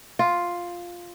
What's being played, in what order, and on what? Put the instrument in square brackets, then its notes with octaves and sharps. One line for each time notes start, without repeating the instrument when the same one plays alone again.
[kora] F4